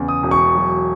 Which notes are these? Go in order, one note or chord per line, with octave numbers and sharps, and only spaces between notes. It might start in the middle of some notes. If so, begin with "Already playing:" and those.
Already playing: E2 C#3
D#6
E1
C#6
F#3